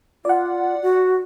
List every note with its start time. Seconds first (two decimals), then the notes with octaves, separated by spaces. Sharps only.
0.25 F4 D5 F#5
0.82 F#4